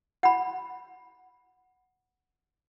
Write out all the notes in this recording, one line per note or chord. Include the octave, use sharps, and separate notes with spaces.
F#5 B5